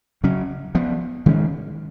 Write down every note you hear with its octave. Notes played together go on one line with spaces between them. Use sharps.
C#3 F#3 C#4
F3 B3
D#3 G#3 C#4